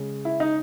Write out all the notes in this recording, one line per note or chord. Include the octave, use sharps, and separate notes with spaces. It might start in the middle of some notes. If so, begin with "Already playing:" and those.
Already playing: C#3 G#3
E4
D#4